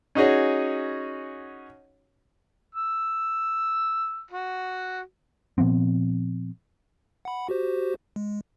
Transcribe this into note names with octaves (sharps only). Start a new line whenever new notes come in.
C#4 D#4 F#4 G#4 C#5
E6
F#4
A#2 F3 B3 C4
F#5 B5
F#4 G4 C5
G#3